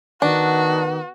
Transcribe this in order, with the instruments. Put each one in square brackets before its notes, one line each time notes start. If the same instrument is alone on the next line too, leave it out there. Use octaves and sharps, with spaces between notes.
[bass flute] D#3 [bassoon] B3 [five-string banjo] D4 [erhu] F#4